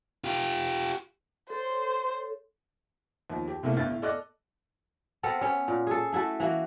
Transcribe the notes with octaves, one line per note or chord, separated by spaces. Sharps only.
F4 G4
A4 C5 C#5
D#2 F3
G4
C2 A2 C3 A3 A#3
G1 G2 F6 A6
A2
A4 D5 D#5 D6 F6 F#6
B3 C4 A4 A#4
B3 C#4
A#2
G#4 A4
A3 E4 F#4 A4
E3 A#3 F#4